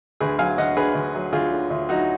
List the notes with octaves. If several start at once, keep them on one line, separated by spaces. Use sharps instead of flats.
D2 G#4 B4
F#3 F5 G#5
D2 D#5 F#5
D3 G#4 B4
D2
F#3
D2 F4 G#4
D3
D2
F#3 D#4 F#4